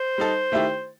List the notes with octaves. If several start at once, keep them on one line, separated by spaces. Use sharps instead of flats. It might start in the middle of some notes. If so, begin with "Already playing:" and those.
Already playing: C5
G3 D#4 A4
D#3 A3 E4 G4